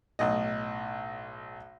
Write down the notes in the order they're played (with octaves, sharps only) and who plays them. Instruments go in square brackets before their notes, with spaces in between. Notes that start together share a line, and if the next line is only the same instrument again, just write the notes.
[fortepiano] B1 A2 D#5